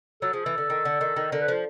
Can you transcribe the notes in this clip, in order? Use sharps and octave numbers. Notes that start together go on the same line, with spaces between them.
F#3 A4
F3 G#4
E3 A4
D3
D#3
D3
D#3
D#3
D3 A#4
B4
F3 C5